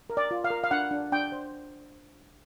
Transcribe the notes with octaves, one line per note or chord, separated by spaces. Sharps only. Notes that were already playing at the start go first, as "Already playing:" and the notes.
A#4
D5
F4
F5
A#4
F5
D4 F#5
D4
D4 G5
C5